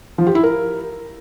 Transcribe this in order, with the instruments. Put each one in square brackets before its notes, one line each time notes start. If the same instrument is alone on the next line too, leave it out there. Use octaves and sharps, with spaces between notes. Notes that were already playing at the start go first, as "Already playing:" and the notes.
[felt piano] F3
G4
E4
A#4